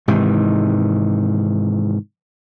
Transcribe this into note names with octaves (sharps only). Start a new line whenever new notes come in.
G#2 C3 D#3 E3